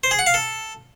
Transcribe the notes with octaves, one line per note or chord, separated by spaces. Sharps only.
C5
G#4
F#5
F5
A4